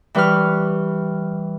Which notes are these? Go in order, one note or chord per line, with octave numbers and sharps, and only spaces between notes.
E3 G3 B4 C#6 F6